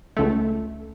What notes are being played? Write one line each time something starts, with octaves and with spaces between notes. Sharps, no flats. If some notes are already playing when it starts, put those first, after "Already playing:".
C#2 A3